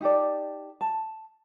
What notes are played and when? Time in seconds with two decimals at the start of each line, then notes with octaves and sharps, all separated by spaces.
0.01 D#4 G4 A4 D5
0.81 A5